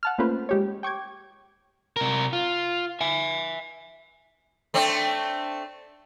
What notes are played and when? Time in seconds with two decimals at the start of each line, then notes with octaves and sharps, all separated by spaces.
0.03 F#5 A5 F6
0.18 A3 A#3 C#4 F4 B4 C5
0.49 G#3 G4 C#5
0.83 G5 C#6 D6 G#6
1.96 C3 A#4
2.33 F4
3.01 E5 G#5
4.74 A3 C4 D4